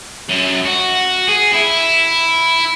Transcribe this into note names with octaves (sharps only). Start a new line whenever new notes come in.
F#2
F#4
G#4
E4